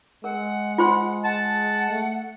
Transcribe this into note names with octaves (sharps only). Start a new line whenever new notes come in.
G#3 A#4 F#5
F4 C5 C6
F#5 A5
A3